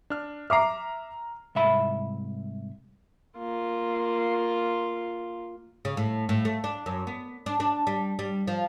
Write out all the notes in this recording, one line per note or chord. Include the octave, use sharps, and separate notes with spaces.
D4 F6
E5 A#5 D6 F6 C7
C2 G#2 E5 B5
A#3 F4
C#3
A2
A2
A3
D4
F#2
B3
D4
D4
G3
G3
F3